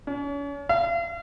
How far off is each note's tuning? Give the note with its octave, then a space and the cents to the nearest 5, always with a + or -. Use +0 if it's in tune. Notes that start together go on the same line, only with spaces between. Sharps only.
C#4 +40
F5 -45